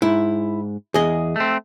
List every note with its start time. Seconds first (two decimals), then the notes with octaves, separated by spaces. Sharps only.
0.02 G#2 E4
0.94 E2 G#4 D#5
1.36 A3 C4